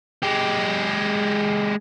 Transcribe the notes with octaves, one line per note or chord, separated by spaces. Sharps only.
G#3 G4